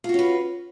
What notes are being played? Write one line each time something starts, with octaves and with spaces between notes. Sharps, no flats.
C#4 F4 F#4 B4